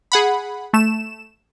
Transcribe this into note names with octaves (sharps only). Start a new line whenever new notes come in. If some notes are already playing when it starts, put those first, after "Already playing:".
G#4 F#5 B5
A3 E7